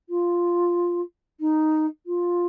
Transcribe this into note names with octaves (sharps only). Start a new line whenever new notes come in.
F4
D#4
F4